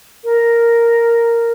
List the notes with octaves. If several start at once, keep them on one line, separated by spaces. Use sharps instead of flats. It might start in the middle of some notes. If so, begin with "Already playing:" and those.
A#4